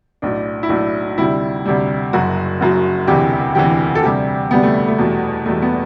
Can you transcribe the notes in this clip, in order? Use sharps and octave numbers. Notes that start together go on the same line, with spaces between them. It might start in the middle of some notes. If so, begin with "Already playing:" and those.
B1 A2 F#3 D4
E4
B1 A2 F#3 D4
D2 C3 G3 E4
D2 C3 G3
F#1 F#2 F#3 F#4
F#1 F#2 F#3
E1 D2 C3 E3 G4
E1 D2 C3 E3 G4
A4
D2 C3 G3 G4
D2 C3 G3 B3
A3
A3
E2 B2 G3
E2 B2 G3 A3
B3